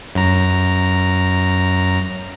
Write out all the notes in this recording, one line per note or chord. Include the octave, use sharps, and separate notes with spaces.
F#2 A#5